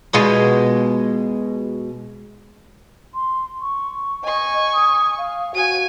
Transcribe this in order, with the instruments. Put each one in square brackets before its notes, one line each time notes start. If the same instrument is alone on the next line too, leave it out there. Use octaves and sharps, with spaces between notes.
[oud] B2 G#3 F4
[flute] C6
C#6
[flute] D#5 [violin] G#5 C#6
[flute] D#6
F5
[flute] F#4 [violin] G#5 D#7